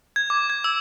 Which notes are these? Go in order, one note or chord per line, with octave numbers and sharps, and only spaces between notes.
G#6
D6
G#6
E6